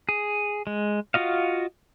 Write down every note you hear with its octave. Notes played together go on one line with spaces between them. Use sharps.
G#4
G#3
F4 F#4 D#5 F5